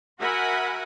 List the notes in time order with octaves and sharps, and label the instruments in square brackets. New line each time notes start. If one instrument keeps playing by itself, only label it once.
[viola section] F#4 A#4 E5 F#5 G#5 B5